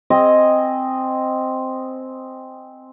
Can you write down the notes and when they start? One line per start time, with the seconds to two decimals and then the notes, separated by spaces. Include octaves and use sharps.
0.10 C4 D#5 G#5